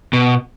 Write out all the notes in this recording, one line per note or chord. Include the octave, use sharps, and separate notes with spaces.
B2